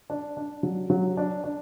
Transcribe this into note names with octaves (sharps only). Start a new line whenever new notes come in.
D4
D4
F#3
F#3
D4
D4